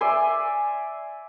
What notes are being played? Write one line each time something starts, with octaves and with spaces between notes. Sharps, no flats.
D5 E5 G#5 C6